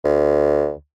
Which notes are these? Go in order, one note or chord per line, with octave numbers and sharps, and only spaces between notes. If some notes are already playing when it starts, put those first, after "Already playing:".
D2